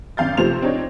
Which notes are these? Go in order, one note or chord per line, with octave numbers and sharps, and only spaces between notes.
G#1 F#2 F5 G6 A6
C3 F3 A3 C5 F7
C4 D4 D#4 C#5